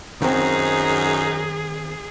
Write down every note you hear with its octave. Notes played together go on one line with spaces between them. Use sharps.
F#2 D#3 C4 D#4 G#4